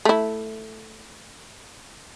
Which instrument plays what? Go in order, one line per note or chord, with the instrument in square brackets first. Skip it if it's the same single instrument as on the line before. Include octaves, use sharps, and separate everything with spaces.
[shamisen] A3 E4